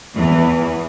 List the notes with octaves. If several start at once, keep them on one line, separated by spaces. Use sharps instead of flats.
E2 E3